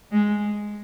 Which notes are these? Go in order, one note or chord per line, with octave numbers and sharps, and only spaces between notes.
G#3